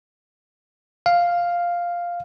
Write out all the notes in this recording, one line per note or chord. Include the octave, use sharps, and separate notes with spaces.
F5